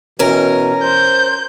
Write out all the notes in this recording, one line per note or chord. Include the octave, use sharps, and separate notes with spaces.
B2 E3 C#4 A#4
C5 G6